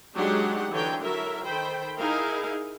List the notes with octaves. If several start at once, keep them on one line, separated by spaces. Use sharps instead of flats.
F#3 G#3 D4 D#4 G4 F#5
D3 E3 F#3 D#4 C#5 G5
F#3 E4 A4 A#4 E5
D#3 A4 C5 G5 B5
D#4 E4 G#4 A#4 F5